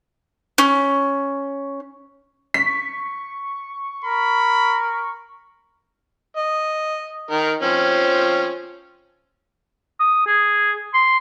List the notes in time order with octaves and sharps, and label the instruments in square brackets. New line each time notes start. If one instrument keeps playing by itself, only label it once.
[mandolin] C#4
[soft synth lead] C#6 [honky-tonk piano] B6
[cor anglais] A#4 [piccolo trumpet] B5
[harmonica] D#5
D#3 A#4
F3 C4 C#4
[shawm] D#6
G#4
C6